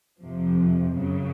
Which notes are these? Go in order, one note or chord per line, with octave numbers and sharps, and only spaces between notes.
F2 C3 F3
F#2 C#3 F#3